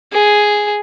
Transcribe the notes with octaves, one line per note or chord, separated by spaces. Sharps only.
G#4